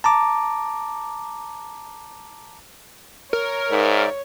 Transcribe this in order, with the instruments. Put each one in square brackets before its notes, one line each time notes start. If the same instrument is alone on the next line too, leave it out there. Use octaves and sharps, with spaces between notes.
[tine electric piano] A5 A#5 D6
[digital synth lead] A#4 [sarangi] C#5
[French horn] G#2 [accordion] D#4 D5 E5